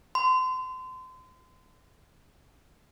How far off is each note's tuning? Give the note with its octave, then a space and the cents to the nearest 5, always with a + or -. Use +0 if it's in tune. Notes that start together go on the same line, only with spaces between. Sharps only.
C6 -30